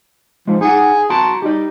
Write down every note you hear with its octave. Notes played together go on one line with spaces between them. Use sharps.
F3 G#3 D#4
D#4 G#4 F#5
F#4 A5 A#5 C6
D#4 G4 D5